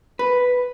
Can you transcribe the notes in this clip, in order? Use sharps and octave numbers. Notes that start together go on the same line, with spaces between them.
B4